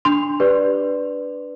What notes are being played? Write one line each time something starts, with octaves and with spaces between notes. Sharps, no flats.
D4 C6
G4 B4 D5